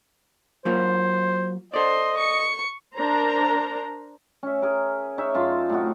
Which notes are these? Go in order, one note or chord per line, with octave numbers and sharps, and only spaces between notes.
F#3 A#3 F4 C5
A4 C5 D5 D#5 C6
C#6 C#7
D4 A#4 C5 A#5
C#4 E5
G#4 A#4
D#4 G#4 C#5 E5
F#2 F4 A5 C6
A2 C3 D#4 F#4